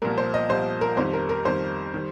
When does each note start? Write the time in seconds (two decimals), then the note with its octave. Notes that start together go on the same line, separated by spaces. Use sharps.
0.02 C2 A#2 F3 A#4
0.18 C5
0.34 D#5
0.49 C2 A#2 F3 C5
0.81 A#4
0.97 F2 D#3 G3 C5
1.13 A#4
1.29 A#4
1.45 F2 D#3 G3 C5
1.94 D#3 G3